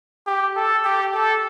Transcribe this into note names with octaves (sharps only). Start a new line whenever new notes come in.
G4
A4
G4
A4